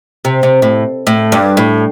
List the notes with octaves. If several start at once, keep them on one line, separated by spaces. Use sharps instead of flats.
C3
C3
A2
A2
G2
A2